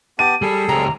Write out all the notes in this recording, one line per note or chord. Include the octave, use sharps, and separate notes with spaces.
B3 G4 A5 D#7
G3 G#4 A4
C#2 G4 A#5